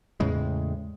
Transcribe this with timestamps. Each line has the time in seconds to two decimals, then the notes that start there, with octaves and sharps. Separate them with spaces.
0.20 E2 A2 C#3 G#3